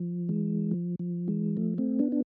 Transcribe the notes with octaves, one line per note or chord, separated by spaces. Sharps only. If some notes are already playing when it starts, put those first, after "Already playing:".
Already playing: F3
E3 G#3
F3
F3
E3 G#3
F3 A3
A3 C4
B3 D4
D4